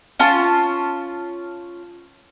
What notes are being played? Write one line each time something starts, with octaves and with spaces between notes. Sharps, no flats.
C#4 F4 A5